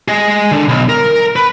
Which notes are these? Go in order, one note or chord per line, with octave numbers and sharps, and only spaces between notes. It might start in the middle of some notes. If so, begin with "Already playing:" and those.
G#4 D#5
D3
B1
A#4
B4